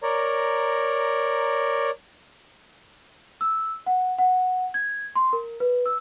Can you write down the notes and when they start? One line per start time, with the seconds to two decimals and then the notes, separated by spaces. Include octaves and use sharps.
0.03 A#4 C#5 D5 A#5
3.41 E6
3.86 F#5
4.18 F#5
4.74 G#6
5.16 C6
5.33 A#4
5.60 B4
5.86 E6